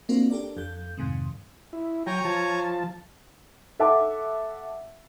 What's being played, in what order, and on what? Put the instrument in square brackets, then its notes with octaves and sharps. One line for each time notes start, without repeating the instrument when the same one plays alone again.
[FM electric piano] A#3 C4 D4 F4 F#4 A#4
D4 G4 A4 A#4 D5
F2 A4 G6
F2 G#2 C3 D#3
[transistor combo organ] E4
[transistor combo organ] F#3 G5 [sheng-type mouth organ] C#5 G#5 A#5
[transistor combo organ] F3 A5
[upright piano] A4 E5 F#5 A5 D6